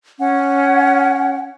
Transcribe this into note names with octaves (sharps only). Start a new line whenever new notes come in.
C#4 F#5